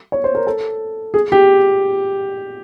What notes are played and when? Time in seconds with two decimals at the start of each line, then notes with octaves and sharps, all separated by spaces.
0.12 C#5
0.24 C5
0.35 A#4
0.47 A4
1.14 G#4
1.32 G4